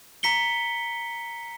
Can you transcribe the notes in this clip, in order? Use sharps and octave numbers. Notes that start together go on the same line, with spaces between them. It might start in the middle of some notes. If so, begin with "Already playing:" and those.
A#5 B6 C#7 G7